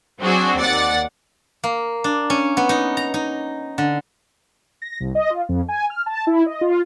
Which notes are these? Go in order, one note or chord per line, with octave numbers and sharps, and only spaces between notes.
F#3 C4 D4 F#4 G#4
D#2 D5 F#5 A6
A#3
D4
C#4
B3
D#4
A#5
D#4
D3
A#6
C2
D#5
F4
F2
G#5
F6
A5
E4
D#5
F4